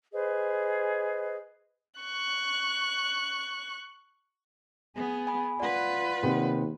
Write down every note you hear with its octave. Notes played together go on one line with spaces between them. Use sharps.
G#4 B4 C5 D#5
C#6 F#6
B3 G#4
G#5 B5
F4 B4 D5 F#5
D#2 C3 B3